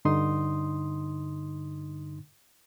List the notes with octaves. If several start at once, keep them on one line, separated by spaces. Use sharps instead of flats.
G2 D3 D#4 C6 D#6